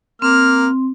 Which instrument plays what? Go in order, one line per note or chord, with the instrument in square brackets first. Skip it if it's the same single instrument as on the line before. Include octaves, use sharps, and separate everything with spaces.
[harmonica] A#3 F6 [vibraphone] C4